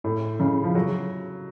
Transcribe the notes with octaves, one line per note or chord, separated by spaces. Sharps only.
A2
C#3
F3
F#3